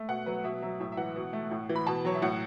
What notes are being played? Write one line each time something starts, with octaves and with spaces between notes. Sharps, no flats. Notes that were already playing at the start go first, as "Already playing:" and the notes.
Already playing: A3
B2 F#5
F#3 B4
B2 E5
F#3 E5
A2 E5
E5
E3 F#5
B2
A3
A2
E3
B5
B2 A5
F#3 C#5
E5
A2 F#5